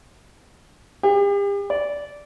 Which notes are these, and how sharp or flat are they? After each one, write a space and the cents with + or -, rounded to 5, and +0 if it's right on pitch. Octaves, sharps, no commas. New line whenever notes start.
G4 +40
D5 -15